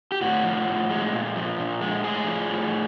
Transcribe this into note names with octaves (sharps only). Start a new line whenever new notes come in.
G4
A2 F#4
F3
A2
G#3
A#2
F3
A#2
G#3
A2 G#4
F3
A2